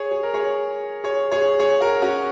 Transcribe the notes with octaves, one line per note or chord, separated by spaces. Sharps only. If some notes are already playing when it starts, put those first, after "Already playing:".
Already playing: G#4 C#5
G#4
A#4
G#4 C#5
G#4 C#5
G#4 C#5
G#4 C#5
F#4 A#4
C#4 F#4